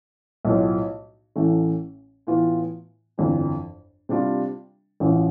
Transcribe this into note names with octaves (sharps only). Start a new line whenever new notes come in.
B1 A2 F3
A1 A2 E3 A3
A2 E3 B3 F4
G1 F2 E3
C3 G3 D4 F4
A1 A2 F3